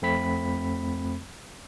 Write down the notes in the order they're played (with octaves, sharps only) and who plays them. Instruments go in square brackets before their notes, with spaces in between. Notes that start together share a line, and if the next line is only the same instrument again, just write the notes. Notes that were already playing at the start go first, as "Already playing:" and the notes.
[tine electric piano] F2 A3 C4 B5 B6